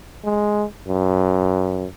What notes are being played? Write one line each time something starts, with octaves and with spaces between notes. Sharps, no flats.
G#3
F#2